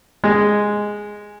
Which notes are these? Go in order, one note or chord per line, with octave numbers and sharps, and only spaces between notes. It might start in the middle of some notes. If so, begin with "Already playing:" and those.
G#3